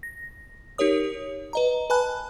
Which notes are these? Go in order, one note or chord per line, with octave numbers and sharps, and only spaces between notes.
A#6
D#4 G4 A#4 C#5 D#6
B4 D#5 A#5
B4 G#5 A5 B5 F#6